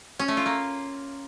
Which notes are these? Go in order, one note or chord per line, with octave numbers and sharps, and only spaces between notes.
C#4
A3
F4
A#3